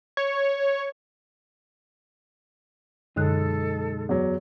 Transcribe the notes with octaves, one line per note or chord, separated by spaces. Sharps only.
C#5
B1 F#2 D3 G#3 D#4 A4 F#6
E2 F#3